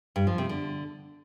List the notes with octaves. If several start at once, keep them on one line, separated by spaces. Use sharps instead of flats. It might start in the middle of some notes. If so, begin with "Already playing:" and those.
G2
F3
C3
D3